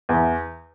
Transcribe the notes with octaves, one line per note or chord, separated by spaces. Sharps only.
E2